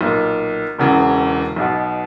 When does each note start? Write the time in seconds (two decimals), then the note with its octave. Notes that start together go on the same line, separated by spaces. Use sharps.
0.01 B1 A#2
0.78 E1 E2 C#3 E3
1.56 B1 B2